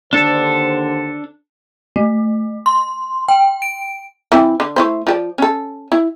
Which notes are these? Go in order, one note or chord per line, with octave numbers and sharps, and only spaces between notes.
D#2 D3 D4 A4 C5
A3
C6
G5
D7
E3 C4 E4
D3
A3 E4 C5
F3 G4 D5
C#4 A4
E4